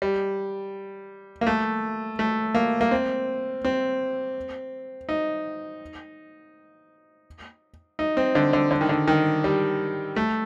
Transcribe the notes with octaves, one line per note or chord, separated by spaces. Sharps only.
G3
A#3
A3
A3
A#3
A#3
C4
C4
D#4
D#4
C4
D3
D3
D3
D#3
D3
D#3
G3
A3